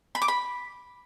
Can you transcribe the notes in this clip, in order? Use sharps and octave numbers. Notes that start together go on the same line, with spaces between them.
B5
D6
B5